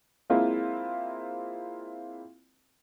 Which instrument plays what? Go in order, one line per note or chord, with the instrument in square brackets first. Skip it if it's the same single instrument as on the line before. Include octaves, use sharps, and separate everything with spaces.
[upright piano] G#3 A#3 C4 E4 F4